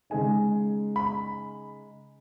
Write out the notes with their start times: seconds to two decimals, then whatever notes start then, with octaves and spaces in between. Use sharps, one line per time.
0.10 C#3 G#3 D#4 G#5
0.96 B5